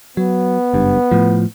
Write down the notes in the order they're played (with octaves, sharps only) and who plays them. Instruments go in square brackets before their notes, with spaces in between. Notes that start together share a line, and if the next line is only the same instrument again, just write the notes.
[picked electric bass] F#3 [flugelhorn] B3
[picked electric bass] F#1 G2
A2 F3